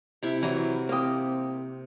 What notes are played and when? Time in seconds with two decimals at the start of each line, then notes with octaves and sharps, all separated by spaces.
0.23 C3 E4
0.43 E3 F#3 A#5
0.89 A#3 C4 G4 D#6